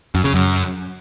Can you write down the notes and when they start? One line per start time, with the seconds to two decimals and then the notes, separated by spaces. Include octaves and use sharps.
0.15 F#2
0.24 C#3
0.34 F#2